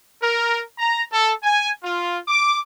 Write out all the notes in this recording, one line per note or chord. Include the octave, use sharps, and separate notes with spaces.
A#4
A#5
A4
G#5
F4
D6